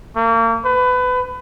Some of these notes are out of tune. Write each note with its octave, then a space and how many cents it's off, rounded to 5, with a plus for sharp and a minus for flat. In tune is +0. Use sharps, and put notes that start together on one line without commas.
A#3 -35
B4 +25